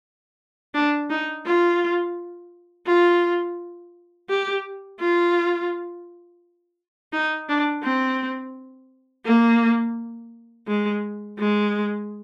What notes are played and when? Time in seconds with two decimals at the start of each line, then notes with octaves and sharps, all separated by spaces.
0.74 D4
1.10 D#4
1.46 F4
2.87 F4
4.29 G4
5.00 F4
7.13 D#4
7.49 D4
7.83 C4
9.25 A#3
10.68 G#3
11.39 G#3